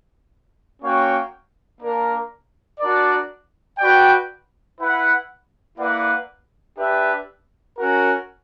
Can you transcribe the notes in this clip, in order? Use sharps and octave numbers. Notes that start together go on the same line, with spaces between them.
A#3 C#4 F#4 C#5 G5
A#3 D4 A#4
D4 F#4 A#4 D5
F#4 B4 D5 G5
E4 B4 F#5
A#3 E4 B4 D5 F#5
D4 G4 B4 E5
C#4 F#4 A#4